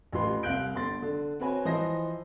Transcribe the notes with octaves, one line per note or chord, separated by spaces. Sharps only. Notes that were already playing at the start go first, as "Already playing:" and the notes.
A1 F4 G4 B4 C6
C2 F5 F#6 G6 D7
G1 C6 A6
D3
C4 F#4 B4 C#5 G#5
E3 F3 C5 D#5 A#6